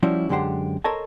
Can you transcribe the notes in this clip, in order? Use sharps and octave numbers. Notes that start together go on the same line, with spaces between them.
F3 G3 C#4 E4 F#4
F#2 D3 G#3 G4 C5 F#5
A4 A#4 C5 C#5 D#5 A5